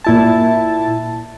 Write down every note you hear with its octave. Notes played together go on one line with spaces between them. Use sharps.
A#2 E4 A5